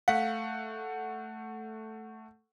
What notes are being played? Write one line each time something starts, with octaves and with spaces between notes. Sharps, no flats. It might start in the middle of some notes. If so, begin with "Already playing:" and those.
A3 F5 F#5